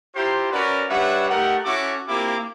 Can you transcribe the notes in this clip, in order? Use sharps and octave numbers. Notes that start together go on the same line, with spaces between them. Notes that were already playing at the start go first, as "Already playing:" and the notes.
E4 F4 G4 C5 A#5 C6
C#4 F#4 A#4 B4 D5
G3 D4 B4 C#5 E5 F#5
A3 D#4 G4 A4 A#4 F#5
C#4 E4 F#4 A4 D6
A#3 C4 E4 F4 G4 D6